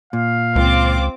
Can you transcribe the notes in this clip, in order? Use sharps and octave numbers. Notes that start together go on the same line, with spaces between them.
A#2 F5
C#2 C4 F4 D6